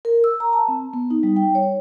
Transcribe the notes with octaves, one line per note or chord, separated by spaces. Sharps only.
A#4
E6
A#5
A5
C4
B3
D#4
G3
G5
C#5